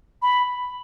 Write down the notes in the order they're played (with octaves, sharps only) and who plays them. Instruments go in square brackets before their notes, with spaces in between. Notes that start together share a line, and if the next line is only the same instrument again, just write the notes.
[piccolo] B5